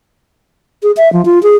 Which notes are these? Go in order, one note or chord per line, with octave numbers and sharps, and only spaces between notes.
G#4
E5
F3
F4
G#4